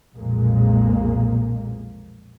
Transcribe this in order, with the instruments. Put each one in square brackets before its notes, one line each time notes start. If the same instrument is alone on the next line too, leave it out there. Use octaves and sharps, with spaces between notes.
[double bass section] B1 F2 A#2 G#3 A#3